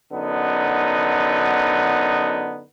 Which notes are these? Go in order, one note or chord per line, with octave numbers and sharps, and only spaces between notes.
F#2 D3 B3 D#4